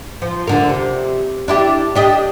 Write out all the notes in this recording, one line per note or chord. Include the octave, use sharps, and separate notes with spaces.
F3
D2 D3 A#4
C3
D4 E4 G4
D4 G4 D#5